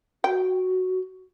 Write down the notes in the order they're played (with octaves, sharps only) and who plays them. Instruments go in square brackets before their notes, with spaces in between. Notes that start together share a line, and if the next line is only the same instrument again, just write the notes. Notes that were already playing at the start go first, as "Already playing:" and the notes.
[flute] F#4 [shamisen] G5